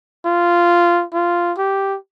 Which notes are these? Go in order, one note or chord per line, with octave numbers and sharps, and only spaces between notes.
F4
F4
G4